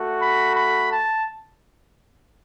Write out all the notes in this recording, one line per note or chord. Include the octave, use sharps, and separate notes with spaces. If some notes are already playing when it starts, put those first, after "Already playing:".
Already playing: A3 F#4
B5
B5
A5